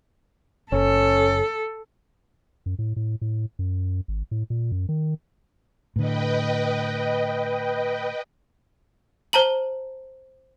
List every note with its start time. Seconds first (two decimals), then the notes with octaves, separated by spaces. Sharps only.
0.72 F#1 C#4 A4
2.66 F#2
2.79 A2
2.96 A2
3.21 A2
3.59 F#2
4.08 G#1
4.31 A2
4.50 A#2
4.72 F#2
4.89 D#3
5.96 A2 D3 B4 D#5 G5
9.33 C5 A5 A#5 F#7